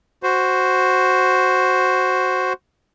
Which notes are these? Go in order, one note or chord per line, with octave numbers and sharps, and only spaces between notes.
F#4 C5